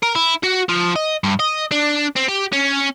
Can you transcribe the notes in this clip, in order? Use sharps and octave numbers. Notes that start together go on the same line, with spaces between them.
A#4
E4
F#4
F3
D#5
G2
D#5
D4
C4
G4
C#4